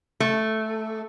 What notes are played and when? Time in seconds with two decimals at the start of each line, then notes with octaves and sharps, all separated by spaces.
0.20 A3